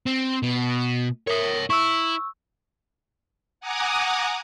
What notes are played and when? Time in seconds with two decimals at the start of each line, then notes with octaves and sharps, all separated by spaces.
0.06 C4
0.43 B2
1.27 A#4 C#5 E5 D#6
1.70 E4 C#6 E6
3.60 F#5 G#5 A#5 D6 D#6